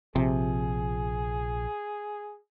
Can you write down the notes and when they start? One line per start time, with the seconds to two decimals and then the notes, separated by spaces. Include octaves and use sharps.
0.16 A#1 C3 F3 G#4